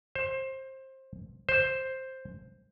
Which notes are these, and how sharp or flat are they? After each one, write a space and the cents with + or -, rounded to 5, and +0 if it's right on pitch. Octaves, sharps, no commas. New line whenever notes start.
C5 +20
C5 +5